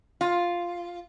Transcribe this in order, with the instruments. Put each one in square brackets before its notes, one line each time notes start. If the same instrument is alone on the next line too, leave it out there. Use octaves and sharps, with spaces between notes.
[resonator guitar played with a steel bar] F4